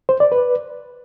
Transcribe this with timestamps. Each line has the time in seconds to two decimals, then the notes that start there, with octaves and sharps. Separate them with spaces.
0.09 C5
0.20 D5
0.32 B4